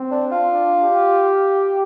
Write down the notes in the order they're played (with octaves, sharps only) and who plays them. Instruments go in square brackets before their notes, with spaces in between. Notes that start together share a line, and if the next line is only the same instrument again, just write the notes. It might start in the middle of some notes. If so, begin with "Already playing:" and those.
Already playing: [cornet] C4
[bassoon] D4
F4
[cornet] D4
G4